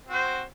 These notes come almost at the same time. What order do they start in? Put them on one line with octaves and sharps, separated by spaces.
C4 F#4 C5